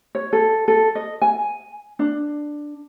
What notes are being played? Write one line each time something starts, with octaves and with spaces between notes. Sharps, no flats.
C#5
A4
A4
D#5
G#5
D4